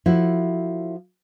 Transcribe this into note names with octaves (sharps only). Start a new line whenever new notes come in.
F3 E4 F#4 A4